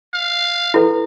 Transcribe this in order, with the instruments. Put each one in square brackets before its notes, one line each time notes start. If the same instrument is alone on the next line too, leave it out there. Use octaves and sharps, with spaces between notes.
[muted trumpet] F5
[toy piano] E4 A4 B4